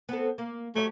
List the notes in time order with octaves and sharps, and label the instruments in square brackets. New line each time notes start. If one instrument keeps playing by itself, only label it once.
[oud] B3 C4 A4
A#3
[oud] F#3 G4 C#5 [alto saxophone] A3